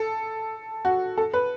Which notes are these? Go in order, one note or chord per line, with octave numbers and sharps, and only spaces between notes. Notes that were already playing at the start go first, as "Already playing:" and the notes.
Already playing: A4
F#4
A4
B4